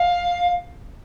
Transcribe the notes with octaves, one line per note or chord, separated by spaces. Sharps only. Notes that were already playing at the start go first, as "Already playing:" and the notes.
Already playing: F5